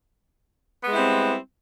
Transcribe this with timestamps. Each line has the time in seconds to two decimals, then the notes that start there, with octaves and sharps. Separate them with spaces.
0.84 B3
0.88 G#3
0.91 E4
0.95 G3
0.98 C4